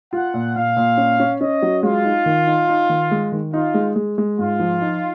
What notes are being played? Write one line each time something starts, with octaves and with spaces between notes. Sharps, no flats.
F4 F#5
A#2
A#2 F5
A#2
C#4
C#4
C#4 D#5
F#3
G#3 F4
D#4
D#3
D#4
D#4
D#3
G#3
D#3
D#4 F4
G#3
G#3
G#3
G#2 F4
F3
D#4